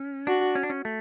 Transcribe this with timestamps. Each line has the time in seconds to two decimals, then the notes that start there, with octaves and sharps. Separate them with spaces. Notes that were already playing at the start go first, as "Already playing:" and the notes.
Already playing: C#4
0.27 D4 F#4
0.55 C#4
0.63 D4
0.70 C#4
0.85 A3